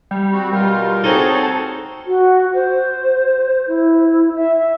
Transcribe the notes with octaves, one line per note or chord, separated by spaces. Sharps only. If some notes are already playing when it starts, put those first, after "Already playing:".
G3
C4 F#4
B2 G3 F4 A#4
C4 D#4 F#4 G#4 A4 C#5
F#4
C5
E4
E5